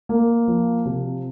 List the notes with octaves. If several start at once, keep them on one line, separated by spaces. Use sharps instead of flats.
A#3
F3
C3